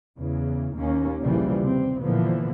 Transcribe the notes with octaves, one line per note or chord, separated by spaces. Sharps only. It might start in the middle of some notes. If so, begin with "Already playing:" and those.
E2 C#3 E3
D#2 D#3 A#3 C#4
A#1 D#2 C#3 E3 F3 G3
C3 C4
A#2 D3 E3 F3 A#3 B3